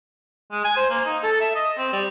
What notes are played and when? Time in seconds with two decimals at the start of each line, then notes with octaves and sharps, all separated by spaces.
0.52 G#3
0.64 G#5
0.77 C5
0.90 A#3
1.05 D#4
1.23 A4
1.41 E5
1.55 D#5
1.78 C4
1.92 G3